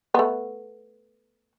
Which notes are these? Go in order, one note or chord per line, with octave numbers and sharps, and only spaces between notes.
A3 B3